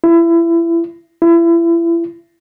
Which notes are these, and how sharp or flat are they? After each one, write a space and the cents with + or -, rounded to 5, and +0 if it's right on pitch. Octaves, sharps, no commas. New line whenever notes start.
E4 +25
E4 +30